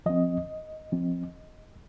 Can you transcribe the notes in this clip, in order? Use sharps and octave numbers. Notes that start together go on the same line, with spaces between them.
F3 C4 D#5
F3 C4